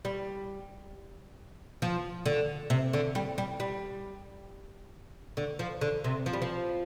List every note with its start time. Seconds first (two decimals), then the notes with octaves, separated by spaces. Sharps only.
0.05 G3
1.82 F3
2.26 D3
2.70 C3
2.93 D3
3.15 G3
3.38 G3
3.60 G3
5.37 D3
5.59 F3
5.81 D3
6.04 C3
6.26 F3
6.33 G3
6.42 F3